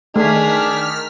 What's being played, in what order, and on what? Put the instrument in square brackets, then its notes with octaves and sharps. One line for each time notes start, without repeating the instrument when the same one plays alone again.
[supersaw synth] D#3 F6 B6 [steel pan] A3 [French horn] D4 [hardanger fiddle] G#4